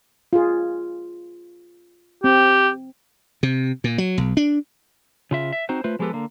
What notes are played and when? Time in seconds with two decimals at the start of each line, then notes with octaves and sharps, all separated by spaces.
0.33 F4 G#4
2.24 C4 G4
3.43 C3
3.84 A#2
3.98 F#3
4.18 B1
4.37 D4
5.31 C#3 F4 E5
5.52 E5
5.69 C4 D#4 F#4 C5
5.84 A3 F4 B4 C5
5.99 F3 G#3 B3 G4 A4 B4
6.13 D3 A#3